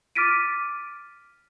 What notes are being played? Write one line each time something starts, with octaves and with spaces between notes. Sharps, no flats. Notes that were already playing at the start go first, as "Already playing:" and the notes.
D6 F6 A6 B6 D7 D#7